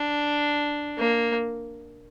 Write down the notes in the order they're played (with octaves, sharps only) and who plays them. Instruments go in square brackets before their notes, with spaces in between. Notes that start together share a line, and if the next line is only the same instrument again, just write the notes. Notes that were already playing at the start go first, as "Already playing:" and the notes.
Already playing: [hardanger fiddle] D4
A#3